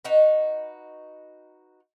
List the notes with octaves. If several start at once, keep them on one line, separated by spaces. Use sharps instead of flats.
D#4 F#4 B4